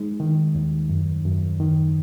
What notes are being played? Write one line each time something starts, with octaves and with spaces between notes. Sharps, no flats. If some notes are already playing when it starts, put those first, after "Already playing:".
Already playing: G#3 D#4
D#3
D#2
F#2
F#2
D#3